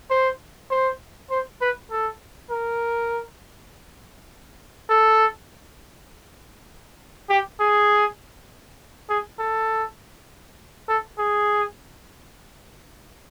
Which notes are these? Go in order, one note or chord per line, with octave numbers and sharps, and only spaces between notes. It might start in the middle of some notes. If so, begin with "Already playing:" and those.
C5
C5
C5
B4
A4
A#4
A4
G4
G#4
G#4
A4
A4
G#4